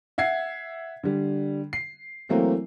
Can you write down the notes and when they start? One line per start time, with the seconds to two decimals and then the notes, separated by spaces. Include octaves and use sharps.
0.18 E5 F#5 G#6 C7
1.04 D3 G3
1.73 C7
2.29 E3 F#3 A3 A#3 C4